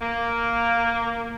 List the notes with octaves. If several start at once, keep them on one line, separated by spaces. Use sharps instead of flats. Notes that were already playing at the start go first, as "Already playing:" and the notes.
A#3